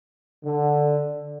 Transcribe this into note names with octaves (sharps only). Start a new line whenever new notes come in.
D3